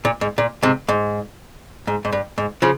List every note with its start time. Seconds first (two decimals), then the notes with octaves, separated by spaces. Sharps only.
0.05 A#2
0.21 G#2
0.38 A#2
0.63 G#2 C3
0.88 G#2
1.87 G#2
2.05 G#2
2.12 G2
2.38 G#2
2.62 C#3 F3